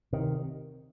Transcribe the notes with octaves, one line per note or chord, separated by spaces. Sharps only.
C3 D#3